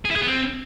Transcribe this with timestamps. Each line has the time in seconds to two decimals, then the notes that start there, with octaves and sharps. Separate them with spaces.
0.05 G#4
0.11 E4
0.16 G#4
0.22 B3
0.27 C4